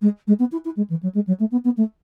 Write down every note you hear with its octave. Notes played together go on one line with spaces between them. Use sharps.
G#3
G#3
B3
E4
E4
G#3
E3
F#3
G#3
F#3
A3
B3
B3
A3